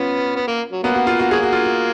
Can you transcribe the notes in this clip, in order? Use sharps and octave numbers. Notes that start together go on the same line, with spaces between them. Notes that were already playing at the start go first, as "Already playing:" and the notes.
Already playing: B3 C#4 F4
B3
A#3
F#3
F#3 A#3 B3
F#4
F4
F#4
F#3 A#3 G#4
F#4
F4
F#4